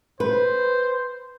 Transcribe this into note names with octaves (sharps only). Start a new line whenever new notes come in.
B4 C5